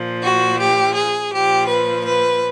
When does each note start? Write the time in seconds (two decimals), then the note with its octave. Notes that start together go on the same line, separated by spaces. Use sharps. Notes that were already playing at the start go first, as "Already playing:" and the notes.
Already playing: A#2 F3
0.23 F#4
0.59 G4
0.96 G#4
1.32 A#2 F3 G4
1.69 B4
2.05 B4